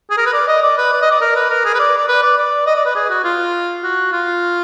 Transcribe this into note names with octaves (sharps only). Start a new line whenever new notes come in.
G#4
A#4
B4
D5
D#5
D5
B4
D5
D#5
D5
A#4
B4
A#4
G#4
B4
D5
D5
B4
D5
D5
D#5
D5
B4
G#4
F#4
F4
F#4
F4